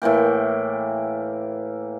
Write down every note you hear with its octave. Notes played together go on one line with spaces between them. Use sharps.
A2 E3 A#3 G5